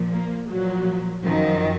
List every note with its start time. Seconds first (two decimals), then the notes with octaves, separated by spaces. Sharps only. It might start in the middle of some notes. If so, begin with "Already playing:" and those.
Already playing: A#2 F3
0.11 A#3
0.49 A#2 F3 F#3
1.24 F#2 D#3 F3